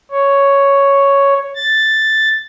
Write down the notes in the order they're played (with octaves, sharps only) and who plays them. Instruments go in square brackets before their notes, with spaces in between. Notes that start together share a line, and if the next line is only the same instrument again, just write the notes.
[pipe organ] C#5
A6